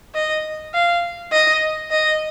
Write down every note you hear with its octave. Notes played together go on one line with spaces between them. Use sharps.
D#5
F5
D#5
D#5